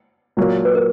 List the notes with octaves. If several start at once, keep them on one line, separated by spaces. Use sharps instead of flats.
A#2 F#3 A#3
B4
A#4